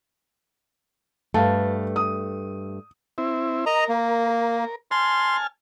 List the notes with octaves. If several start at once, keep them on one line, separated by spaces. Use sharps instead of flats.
G2 A3 B4 F5 A5
D#6
C4 E4
A#4 D#5 A#5
A#3
A#4
G#5 A5 C6 F6